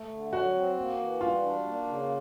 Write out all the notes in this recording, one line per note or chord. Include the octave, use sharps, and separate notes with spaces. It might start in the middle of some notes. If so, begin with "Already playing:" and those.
Already playing: A3
D3
F#3 F#4
C4
A#3
E3
G3 F4
D4
A#3
C#3